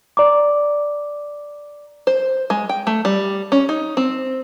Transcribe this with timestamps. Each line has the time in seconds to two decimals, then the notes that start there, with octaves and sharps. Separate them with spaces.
0.17 D5 A#5 D6
2.07 C5
2.50 G#3
2.69 G5
2.87 A3
3.05 G3
3.52 C#4
3.69 D#4
3.97 C4